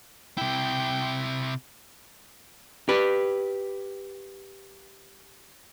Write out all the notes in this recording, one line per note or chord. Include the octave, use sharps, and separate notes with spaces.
C3 E4 G5
G4 B4